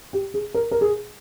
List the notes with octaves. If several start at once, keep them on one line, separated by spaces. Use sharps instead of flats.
G4
G#4
A#4
A#4
G#4